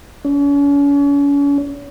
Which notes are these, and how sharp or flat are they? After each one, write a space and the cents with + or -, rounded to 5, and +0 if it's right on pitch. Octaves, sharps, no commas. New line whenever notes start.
C#4 +40